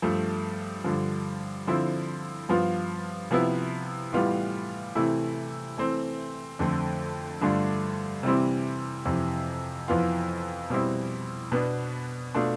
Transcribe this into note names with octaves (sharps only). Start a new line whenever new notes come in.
G2 F3 A3
G2 D3 F3
D3 F3 C4 E4
G2 F3 B3 F4
C3 F3 B3 E4
A2 E3 G3 B3 F4
C3 E3 A3 E4
E3 A3 C4
F2 D3 A3 C4
G2 D3 A3 D4 F4
C3 E3 G3 C4 E4
F2 C3 E3
F2 E3 B3 F4
B2 G3 C4 E4
B2 B3 D4
B2 A3 D4 F4